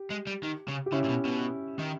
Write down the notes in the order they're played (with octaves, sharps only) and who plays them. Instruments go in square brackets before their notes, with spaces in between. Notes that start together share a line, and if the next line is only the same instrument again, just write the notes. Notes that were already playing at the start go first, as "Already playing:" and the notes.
Already playing: [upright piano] G4
[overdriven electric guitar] G#3
G3
D#3
C#3
[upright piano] G4
[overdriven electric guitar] C#3 [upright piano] C#4 E4
[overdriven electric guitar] A#2
B2
B2
D#3